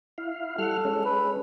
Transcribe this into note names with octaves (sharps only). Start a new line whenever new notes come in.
E4 F5
G3 A4 F#5 F6
G#3 C#4
B4